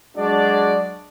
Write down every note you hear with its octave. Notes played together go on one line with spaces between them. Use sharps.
F#3 G#3 D4 F#4 D5